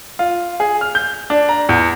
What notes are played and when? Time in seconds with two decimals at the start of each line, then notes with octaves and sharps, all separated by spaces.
0.19 F4
0.60 G#4
0.81 F6
0.95 G6
1.30 D4
1.49 A#5
1.69 E2